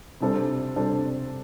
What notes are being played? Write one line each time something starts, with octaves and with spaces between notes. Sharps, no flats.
C3 G3 D4 A4 C5
C3 G3 D4 A4 C5